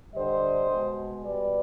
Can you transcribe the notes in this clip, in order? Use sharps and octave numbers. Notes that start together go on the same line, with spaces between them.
D3 G3 C5 D#5
B2 G#3
B2 G3 B4 D5